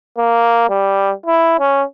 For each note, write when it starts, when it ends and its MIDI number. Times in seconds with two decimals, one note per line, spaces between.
0.18 0.69 58
0.69 1.12 55
1.26 1.59 64
1.60 1.83 61